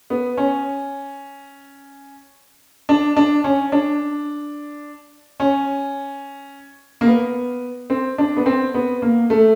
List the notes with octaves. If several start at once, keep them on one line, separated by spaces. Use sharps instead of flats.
B3
C#4
D4
D4
C#4
D4
C#4
A#3
B3
C4
D4
B3
C4
B3
A#3
A3